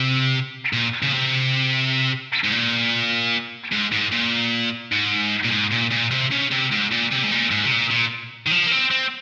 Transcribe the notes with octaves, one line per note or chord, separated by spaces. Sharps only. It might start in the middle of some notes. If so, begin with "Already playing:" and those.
Already playing: C3
A#2
C#3
C3
G#2
A#2
G#2
G#2
A#2
G#2
A#2
G#2
A#2
A#2
C3
C#3
C3
G#2
A#2
C3
G#2
A#2
G#2
C3
A#2
A#2
D#3
F3
A#3
C4
C4